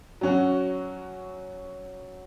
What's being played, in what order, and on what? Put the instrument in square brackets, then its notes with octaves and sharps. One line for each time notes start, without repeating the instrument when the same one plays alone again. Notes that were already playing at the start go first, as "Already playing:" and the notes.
[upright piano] F#3 C#4 F#4